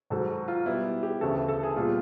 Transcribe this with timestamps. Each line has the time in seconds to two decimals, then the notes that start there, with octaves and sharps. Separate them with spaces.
0.10 G#2 D#3 F#3 A4
0.29 F#4
0.48 F4
0.66 B2 G3 B3 E4
1.03 G4
1.21 D2 C#3 E3 A4
1.48 A4
1.63 G#4
1.76 A#2 G3 B3 F4